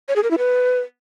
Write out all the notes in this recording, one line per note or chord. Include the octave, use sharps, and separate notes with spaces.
C#5
G#4
A#4
E4
B4